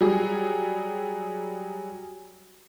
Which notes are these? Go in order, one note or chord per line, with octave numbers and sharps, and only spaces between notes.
F#3 G3 G#4